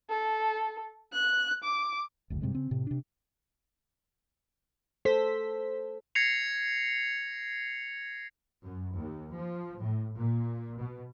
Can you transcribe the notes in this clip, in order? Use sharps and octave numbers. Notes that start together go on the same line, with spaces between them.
A4
F#6
D6
F#1 D2
G2 C3 G#3
C#3 C4
A2 C3
C3 D4
A4 C5 B6
G#6 A#6 C7 C#7 F7
F#2
D#2
F3
A2
A#2
B2